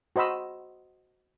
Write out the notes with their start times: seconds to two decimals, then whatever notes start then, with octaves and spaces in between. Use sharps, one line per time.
0.16 F#4 C5 D#5 B5 E6